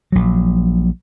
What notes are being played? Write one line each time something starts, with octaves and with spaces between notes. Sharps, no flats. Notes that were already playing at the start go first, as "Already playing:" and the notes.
A#1 F#3